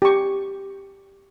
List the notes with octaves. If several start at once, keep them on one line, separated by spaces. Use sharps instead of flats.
G4 C#6